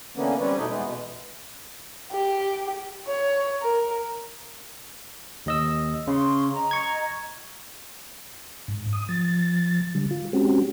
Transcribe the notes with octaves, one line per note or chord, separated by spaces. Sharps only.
D3 E3 A#3 B3 C#4
G3 C4 C#4 B4 C#5 D5
E2 B2 A3 D#4 B4 G5
E3 G#3 B3
B2
G4
C#5
A#4
D#2 D#5 E6
C#3 C6 C#6
D#5 A#5
C#6 G#6
G#2
D#6
F3 A6
D3 G3
F4
G#3 C4 C#4 F#4 G4